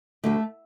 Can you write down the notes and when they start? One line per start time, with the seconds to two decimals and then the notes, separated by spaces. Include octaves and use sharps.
0.24 D2 D3 G3 A3